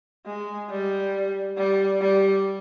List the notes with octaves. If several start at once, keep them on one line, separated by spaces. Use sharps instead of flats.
G#3
G3
G3
G3